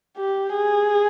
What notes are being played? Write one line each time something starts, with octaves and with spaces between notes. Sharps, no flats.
G4
G#4